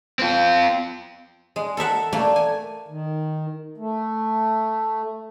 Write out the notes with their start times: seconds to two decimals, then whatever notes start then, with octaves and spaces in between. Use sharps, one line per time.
0.19 C4 F4
1.56 G#3
1.77 A4 A#4 E5 F#5
2.13 A3 A#3 D5
2.36 G#5
2.88 D#3
3.78 A3